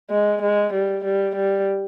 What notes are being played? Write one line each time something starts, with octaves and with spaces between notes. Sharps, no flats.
G#3
G#3
G3
G3
G3